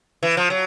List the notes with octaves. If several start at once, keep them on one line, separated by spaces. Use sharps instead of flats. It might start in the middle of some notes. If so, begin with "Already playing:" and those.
E3
F3
F#3